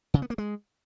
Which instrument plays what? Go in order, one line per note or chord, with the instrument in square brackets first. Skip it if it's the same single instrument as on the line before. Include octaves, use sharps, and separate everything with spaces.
[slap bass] C#3
B3
A#3
G#3